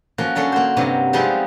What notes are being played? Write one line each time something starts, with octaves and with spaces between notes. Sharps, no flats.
F3 A#3 C#4 F#4
D3 F#3 C#4 A4
A#3 C5
G2 C3 F#3
F3 G3 G#3 B3 C4 D#4